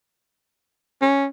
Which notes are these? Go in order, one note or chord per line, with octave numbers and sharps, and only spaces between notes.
C#4